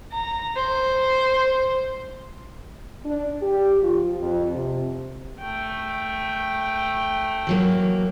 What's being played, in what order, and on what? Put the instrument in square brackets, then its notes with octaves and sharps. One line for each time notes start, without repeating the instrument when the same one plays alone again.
[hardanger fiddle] A#5
C5
[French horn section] D4
G4
F3
F2
C3
[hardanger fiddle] A3 G5
[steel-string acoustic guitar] E3 F#3 A#3